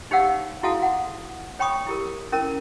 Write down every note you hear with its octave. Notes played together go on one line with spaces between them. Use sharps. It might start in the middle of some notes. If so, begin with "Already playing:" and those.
D#4 G4 C#5 F5 F#5 E6
E4 F#4 G#4 F5 A5 D#6
F#5
C#5 G5 B5 C#6 D#6
E4 G4 A#4
C#4 E4 A#4 A#5